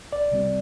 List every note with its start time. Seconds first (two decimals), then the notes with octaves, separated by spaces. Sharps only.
0.13 C2 D5
0.31 C3 G3 C4